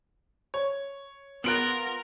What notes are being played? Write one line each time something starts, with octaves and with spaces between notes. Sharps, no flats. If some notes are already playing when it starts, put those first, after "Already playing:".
C#5
B3 F4 A#4 F#6 D7 F#7